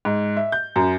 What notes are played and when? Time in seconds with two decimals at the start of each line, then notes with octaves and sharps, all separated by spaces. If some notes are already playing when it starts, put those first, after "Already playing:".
0.05 G#2
0.37 E5
0.52 G6
0.76 F#2